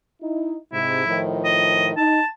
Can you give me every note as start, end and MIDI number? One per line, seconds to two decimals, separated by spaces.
0.22 0.57 63
0.22 0.57 64
0.73 1.04 44
0.73 1.04 48
0.73 1.18 64
1.06 1.93 45
1.06 1.93 51
1.06 1.93 53
1.45 1.87 75
1.97 2.20 63
1.97 2.27 81